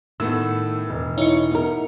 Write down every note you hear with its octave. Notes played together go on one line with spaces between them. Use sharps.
A2 D#3 B3 A4 E6
E1
D#4 E4 C#5 C#7
B3 A#4